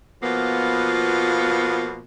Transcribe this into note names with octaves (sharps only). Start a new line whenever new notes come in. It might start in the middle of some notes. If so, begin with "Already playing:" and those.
B2 F3 A#3 B3 F4